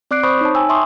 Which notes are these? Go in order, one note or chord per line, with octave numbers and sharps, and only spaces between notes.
C4 D5 D6 F#6 C7 D7
C5 B5 C#6 D#6 G6
D#4 C#5 A5
G5 G#5 E6
E5 A5 C6 C#6 D#6